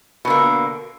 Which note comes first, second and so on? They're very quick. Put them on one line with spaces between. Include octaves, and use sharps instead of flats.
B2 D3 A#3